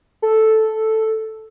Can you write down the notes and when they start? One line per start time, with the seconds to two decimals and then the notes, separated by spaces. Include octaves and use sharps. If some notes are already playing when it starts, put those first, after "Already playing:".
0.22 A4